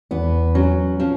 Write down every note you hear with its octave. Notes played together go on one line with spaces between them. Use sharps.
E2 B3
F#3 C#4
F3 C#4